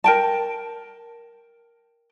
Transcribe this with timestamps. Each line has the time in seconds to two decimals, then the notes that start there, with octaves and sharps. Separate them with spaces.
0.04 A#4 G5 A5